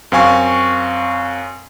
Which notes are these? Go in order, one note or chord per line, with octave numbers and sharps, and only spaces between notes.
F#2 C4 F5 G#5 C#6